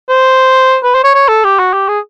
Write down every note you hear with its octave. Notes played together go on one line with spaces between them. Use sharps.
C5
B4
C5
C#5
C#5
A4
G4
F#4
G4
G#4